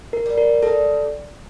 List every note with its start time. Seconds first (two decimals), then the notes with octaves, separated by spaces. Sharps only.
0.13 A#4
0.26 G3
0.38 A#4
0.62 G3 A4